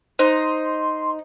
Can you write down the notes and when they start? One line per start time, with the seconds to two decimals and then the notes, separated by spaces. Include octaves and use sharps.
0.19 D#4 C5 C6